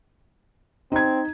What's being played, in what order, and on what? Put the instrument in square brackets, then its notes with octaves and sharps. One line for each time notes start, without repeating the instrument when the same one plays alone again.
[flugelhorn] C4 [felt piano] D#4 G#6